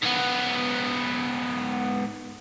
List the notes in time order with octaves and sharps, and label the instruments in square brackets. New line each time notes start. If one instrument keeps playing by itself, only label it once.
[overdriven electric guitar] G#2 B3